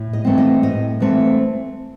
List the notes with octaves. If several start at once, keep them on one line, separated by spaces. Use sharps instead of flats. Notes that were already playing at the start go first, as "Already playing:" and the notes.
Already playing: A2
D#5
E3 A3 C4
D#5
A2 D#5
E3 A3 C4